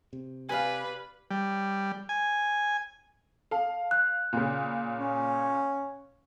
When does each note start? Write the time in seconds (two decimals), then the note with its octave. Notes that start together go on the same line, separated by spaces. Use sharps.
0.13 C3
0.49 G4 B4 D5 F5 G#5
1.31 G3
2.09 G#5
3.51 A4 F5 A5
3.91 F#6
4.33 A#2 C#3
5.00 C#4